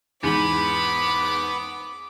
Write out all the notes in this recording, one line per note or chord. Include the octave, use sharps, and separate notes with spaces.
E2 G#2 B3 B5 D6